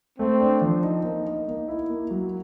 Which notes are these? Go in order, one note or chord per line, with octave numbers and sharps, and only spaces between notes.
A3 C4
D4
F3
D#4
A#3
D#4
A#3
E4
A#3
F#3